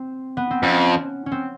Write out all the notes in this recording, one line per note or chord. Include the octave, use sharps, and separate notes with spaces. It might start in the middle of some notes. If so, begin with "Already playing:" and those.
Already playing: C4
B3
C4
F2 C#4
C#4
C4